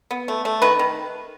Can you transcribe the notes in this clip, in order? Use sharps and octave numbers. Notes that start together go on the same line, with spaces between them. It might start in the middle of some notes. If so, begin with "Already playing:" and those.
B3
A3
A3
D#3 B4
D#3